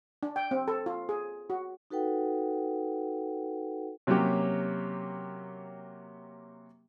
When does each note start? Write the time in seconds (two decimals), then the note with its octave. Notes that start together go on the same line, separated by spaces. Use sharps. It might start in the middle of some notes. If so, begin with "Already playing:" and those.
0.23 D4
0.36 G5
0.51 C4
0.68 A4
0.86 F4
1.09 G#4
1.50 F#4
1.91 D#4 F#4 A4 B4 F#5 G5
4.07 C3 F#3 A#3 C#4 G4